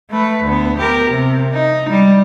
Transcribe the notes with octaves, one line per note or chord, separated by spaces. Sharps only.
A3 B4
D2 B3
G4 A#4
C3
D#4
G3